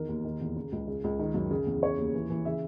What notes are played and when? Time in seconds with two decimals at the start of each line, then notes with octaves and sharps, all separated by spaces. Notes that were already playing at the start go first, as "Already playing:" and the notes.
Already playing: E2 D#3 A#4
0.09 D#2
0.24 D#3
0.41 E2
0.56 C#3
0.72 C#2
0.87 C#3
1.04 C#2
1.19 D#3
1.34 F#2
1.51 C#3
1.67 E2
1.82 C#3 C#5
1.98 D#2
2.14 E3
2.30 E3
2.45 C#3 E5